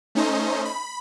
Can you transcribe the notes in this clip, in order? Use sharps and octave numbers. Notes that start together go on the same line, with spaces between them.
A3 C#4 D#4 C5 D#5
B5